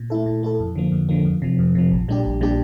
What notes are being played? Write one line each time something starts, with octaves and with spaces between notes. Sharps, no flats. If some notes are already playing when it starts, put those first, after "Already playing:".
Already playing: A#2
A3 E4 A4
A#2
A3 E4 A4
F2
D3 F3 A#3
F2
D3 F3 A#3
F2
C3 F3
F2
C3 F3
A#1
A#2 G3 D4 G4
A#1
A#2 G3 D4 G4